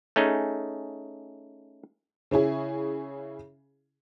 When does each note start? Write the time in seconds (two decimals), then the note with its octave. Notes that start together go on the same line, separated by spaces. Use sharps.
0.16 A3 C#4 D#4 G#4
2.31 C#3 C#4 E4 G#4